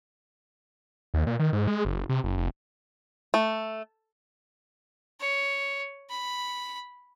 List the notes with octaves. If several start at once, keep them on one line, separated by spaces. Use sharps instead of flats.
D#2
A#2
D#3
G#2
G#3
F#1
C3
F#1
F1
A3
C#5
B5